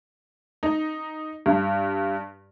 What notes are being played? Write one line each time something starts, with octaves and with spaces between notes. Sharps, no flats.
D#4
G2